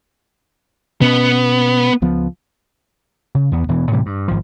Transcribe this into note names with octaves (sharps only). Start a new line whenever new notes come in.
B2 B3 C#4
C#2 F3 B3
C#3
E2 B3
E1 B2 E3
A2 C3 E3 G3
G2
G#1 F3